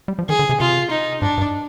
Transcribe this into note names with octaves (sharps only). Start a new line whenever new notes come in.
G3
F3
D#3 G#4
D3
C3
C3 F4
D#4
G#2 D4
G2